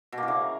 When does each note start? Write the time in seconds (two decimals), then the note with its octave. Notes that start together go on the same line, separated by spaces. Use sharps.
0.12 B2
0.18 A#3
0.23 E3
0.28 C#3